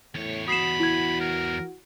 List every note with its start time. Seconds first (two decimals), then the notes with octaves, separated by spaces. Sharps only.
0.15 E2 A2 C#5
0.48 F#4 B5 D#6 C7 E7
0.80 E4 G#6
1.20 A#4